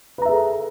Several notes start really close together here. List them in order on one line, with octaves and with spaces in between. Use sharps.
B4 A#5 E5 G#4 A4